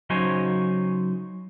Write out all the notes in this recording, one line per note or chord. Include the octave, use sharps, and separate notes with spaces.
C#3 F#3 D#4 C5 C#5 G#5